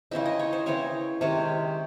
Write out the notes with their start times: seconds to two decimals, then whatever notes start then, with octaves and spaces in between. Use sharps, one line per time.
0.11 C#3 E3 C4 D#4 E5
0.26 D#5
0.39 C#5
0.53 C5
0.66 C#3 E3 C4 D#4 C#5
1.21 C3 D#3 G#3 C#4 C#5